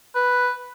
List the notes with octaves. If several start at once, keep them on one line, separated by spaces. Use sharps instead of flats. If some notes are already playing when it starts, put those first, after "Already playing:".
B4